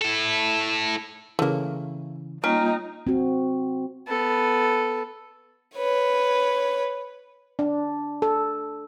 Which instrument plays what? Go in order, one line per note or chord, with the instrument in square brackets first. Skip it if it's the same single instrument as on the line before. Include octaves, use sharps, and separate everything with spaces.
[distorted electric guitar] E4 A4
[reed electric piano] C#3 E3 [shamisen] A3 A#3
[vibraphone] G3 A#3 F4 [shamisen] C#4 [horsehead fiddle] D#4
[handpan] C4 F#4
[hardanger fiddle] B3 A4
[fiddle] B4 C#5
[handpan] D4
A4